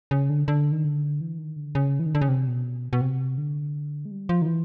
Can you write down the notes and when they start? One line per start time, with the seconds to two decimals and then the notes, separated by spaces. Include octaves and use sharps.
0.11 C#3
0.30 D3
0.48 D3
0.72 D#3
0.85 D3
1.21 E3
1.39 D#3
1.56 D3
1.75 C#3
1.99 E3
2.06 D#3
2.15 D3
2.21 C#3
2.29 C3
2.48 B2
2.93 B2
3.01 C3
3.38 D3
4.05 G#3
4.11 G3
4.29 F3
4.42 D#3
4.46 E3